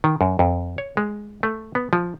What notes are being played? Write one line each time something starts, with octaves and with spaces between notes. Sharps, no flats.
D#3
F#2
F2
C#5
G#3
A3
B3
F3